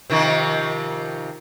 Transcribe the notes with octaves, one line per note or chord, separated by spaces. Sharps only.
C3 D#3 F3